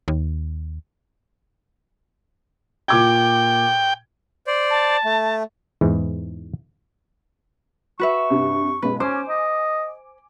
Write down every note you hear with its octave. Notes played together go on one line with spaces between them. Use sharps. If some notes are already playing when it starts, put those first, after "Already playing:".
D#2
A#2 G5 D6 G#6
C5 D5
A5
A3
E2 G#2 E3
F#4 B4 E5 C#6
C2 G2 C3
B1 G#3 B4
C#4 C5 G#5 D6
D#5